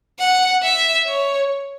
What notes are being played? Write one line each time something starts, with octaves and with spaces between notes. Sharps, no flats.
F#5
E5
C#5